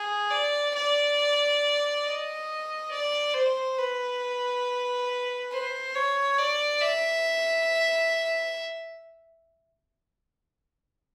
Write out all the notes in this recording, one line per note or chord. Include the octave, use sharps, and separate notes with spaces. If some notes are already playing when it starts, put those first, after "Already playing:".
Already playing: G#4
D5
D5
D#5
D5
C5
B4
C5
C#5
D5
E5